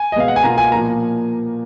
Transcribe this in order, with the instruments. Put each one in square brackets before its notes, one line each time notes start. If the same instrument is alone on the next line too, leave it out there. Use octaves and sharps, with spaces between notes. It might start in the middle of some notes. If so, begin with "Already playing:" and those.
Already playing: [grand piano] G#5
D#5
[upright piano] B2 G#3 B3 [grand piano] F5
[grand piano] F#5
G#5
[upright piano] B2 A#3 F4 [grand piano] A#5
[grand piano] G#5
[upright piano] A#2 F3 A#3 [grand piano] A#5